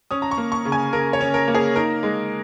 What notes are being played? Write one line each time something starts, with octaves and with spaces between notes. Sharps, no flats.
C#4 D#6
A#5
C#6
A#3
C#6
C#3
G#5
C#3 A#4
C#5
C#4
A#4
A#3
G#4
D#4 A#4
G#3